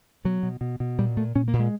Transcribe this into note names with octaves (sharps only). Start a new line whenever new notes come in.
B2 F#3
B2
B2
B2
A#2 G3
A#2 A3
A#2 C#4
A#3
A#2
G#3